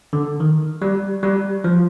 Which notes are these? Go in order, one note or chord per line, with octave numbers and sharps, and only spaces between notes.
D3
D#3
G3
G3
F3